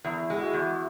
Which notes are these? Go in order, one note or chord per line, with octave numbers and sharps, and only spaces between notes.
E2 E4
G#3
E4 F#4
E2